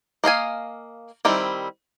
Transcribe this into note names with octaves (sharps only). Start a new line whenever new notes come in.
A#3 D#5 F5 G#5
D#3 G3 C4 E4